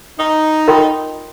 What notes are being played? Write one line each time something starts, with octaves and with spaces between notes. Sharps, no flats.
D#4
F4 A#4 D#5 G5 C6